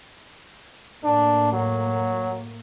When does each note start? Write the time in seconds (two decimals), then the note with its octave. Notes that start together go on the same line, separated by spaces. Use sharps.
1.04 A2 A#3 D4
1.52 F#3